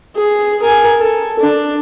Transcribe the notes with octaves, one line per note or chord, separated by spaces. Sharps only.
G#4
A#4 G#5
A4
D4